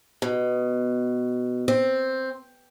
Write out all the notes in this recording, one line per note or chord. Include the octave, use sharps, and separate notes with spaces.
B2
C4